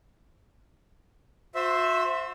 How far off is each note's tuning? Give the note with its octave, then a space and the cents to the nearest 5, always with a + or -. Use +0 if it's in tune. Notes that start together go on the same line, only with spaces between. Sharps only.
F#4 -40 C5 +0 E5 +0